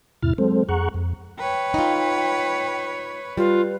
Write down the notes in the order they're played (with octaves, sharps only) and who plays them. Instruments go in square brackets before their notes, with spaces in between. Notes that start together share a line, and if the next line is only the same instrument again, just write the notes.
[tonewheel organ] E2 G#2 C3 E4 F6 A6
F#3 G#3 C4 A4 C5
F2 G#4 F#5 A#5 C#6 F#6
F2
[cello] B4 C#5 [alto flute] G5
[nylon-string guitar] D#4 F4
[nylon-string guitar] G3 [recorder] F4 [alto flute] B4